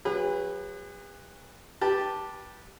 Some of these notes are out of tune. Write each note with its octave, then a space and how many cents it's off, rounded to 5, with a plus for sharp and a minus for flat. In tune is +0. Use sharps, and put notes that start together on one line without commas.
F#3 -15 G#4 -45 B4 +0
G4 +0 B4 -25 A5 +0